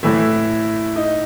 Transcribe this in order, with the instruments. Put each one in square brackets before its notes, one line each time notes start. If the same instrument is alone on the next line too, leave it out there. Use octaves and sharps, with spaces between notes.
[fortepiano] A2 E3 A3 [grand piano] E4
[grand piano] D#4